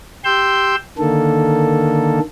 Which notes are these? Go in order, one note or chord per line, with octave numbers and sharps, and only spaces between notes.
G4 G5 C6 E6 G6
D3 D#3 A#3 A4